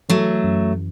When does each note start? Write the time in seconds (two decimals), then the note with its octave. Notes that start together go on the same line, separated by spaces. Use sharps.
0.09 E3 F#3 A3
0.44 F#2